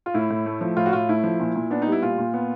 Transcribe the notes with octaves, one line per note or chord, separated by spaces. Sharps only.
F4
A2 E4
A2
A3
F3
A2 F4
F#4
A2 F4
A3 E4
F3
A#2
A#2
B3 D4
D#4
G3
E4
A#2 F4
A#2
B3